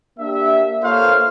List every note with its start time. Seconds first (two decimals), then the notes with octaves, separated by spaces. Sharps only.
0.19 A#3 D4 G4 E5
0.82 A#3 F4 A4 C5 C#5 F5